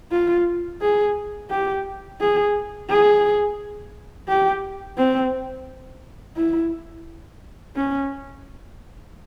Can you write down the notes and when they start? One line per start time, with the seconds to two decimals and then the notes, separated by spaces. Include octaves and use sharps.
0.12 F4
0.81 G#4
1.50 G4
2.20 G#4
2.89 G#4
4.29 G4
4.98 C4
6.37 E4
7.75 C#4